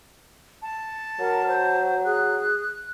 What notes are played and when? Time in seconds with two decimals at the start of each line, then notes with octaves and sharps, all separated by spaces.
0.62 A5
1.19 F#3 A#4
1.48 C5
2.05 G#4 F#6